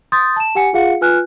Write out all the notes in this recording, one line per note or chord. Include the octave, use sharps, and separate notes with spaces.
C6 D#6 G6 A6
A5 E7
G4 F#5 G#5 C#7
F4 G#4 F5 F#5 C#7
F4 B4 G#5 F6 F#6